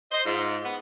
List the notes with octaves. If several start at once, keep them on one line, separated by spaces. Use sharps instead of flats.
C5 D#5
G#2 F4
B3